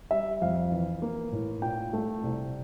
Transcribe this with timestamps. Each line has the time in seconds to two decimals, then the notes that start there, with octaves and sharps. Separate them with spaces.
0.11 G3 E5
0.42 F2 F5
0.72 E3
1.02 A#3
1.32 A2
1.62 A#2 G5
1.93 A3
2.24 C2